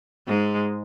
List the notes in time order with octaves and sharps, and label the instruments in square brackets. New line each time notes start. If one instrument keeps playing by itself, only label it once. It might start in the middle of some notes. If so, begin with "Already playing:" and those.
[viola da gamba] G#2 G#3